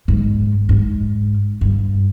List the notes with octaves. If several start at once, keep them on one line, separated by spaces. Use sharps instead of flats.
G#2
G#2
G2